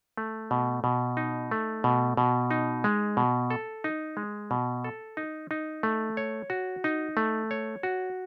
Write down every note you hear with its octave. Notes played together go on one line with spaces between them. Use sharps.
A3
B2
B2
D#4
A3
B2
B2
D#4
G#3
B2
A4
D#4
G#3
B2
A4
D#4
D#4
A3
C#5
F#4
D#4
A3
C#5
F#4